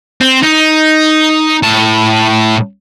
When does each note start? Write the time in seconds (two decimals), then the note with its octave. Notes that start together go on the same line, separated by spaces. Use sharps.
0.21 C4
0.43 D#4
1.63 A2 A5